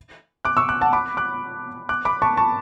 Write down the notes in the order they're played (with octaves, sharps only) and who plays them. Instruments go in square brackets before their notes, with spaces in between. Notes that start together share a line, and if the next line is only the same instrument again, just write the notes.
[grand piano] D6 F#6
C#6 E6
D6 F#6
F#5 A5
B5 D6
D6 F#6
D6 F#6
B5 D6
A5 C#6
A5 C#6